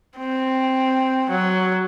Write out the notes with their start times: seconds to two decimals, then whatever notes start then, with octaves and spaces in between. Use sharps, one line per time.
0.17 C4
1.30 F#3